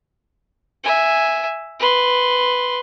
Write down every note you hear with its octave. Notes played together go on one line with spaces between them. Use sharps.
E5 G#5
B4 C6